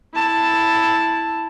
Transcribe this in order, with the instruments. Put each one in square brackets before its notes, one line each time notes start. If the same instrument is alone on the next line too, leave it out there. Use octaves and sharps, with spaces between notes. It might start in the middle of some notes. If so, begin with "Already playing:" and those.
[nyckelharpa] E4 A5